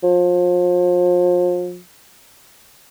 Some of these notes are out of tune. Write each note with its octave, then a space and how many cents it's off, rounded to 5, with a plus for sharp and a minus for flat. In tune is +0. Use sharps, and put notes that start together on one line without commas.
F3 +35